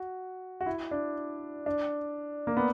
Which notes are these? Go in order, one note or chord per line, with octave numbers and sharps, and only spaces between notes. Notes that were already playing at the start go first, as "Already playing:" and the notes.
Already playing: F#4
F#4
E4
D4
D4
A#3
B3